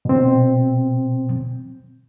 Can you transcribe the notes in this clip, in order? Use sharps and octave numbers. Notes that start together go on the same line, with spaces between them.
B2 C4